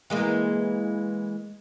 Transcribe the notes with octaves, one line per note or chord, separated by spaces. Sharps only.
E3 G#3 A#3